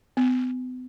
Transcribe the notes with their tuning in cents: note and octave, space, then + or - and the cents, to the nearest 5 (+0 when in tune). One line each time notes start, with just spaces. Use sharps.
B3 +40